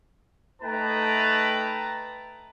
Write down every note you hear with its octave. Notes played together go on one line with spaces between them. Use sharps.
A3 D#4 B4 G5 A5 A#5